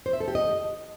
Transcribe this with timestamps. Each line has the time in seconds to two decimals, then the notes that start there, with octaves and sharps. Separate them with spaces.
0.06 C5
0.13 E5
0.20 A4
0.28 G4
0.35 D#5